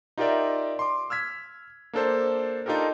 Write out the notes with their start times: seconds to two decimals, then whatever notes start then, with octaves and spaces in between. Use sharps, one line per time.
0.18 D#4 F4 G4 A#4 D5 E5
0.79 C6 D6
1.10 E6 F6 G#6 B6
1.93 A#3 D4 A4 C5
2.66 D4 D#4 F4 G4 A4 A#4